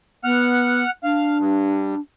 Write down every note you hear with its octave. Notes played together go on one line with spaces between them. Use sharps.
B3 F#5 F6
D4 F5
G2